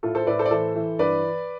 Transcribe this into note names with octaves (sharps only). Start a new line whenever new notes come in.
A2 F4 A4
A4 C5
A2 B4 D5
A4 C5
D5
E3 A4 C5
E3
G2 B4 D5